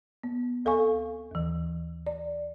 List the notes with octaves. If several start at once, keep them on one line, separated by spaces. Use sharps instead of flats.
B3
D2 A4 F5 G#5 C#6
D#2 E3
D5